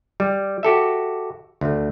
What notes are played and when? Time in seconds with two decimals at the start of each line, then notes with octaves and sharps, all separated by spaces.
0.20 G3
0.63 F#4 G4 A4 E5
1.61 D2 A3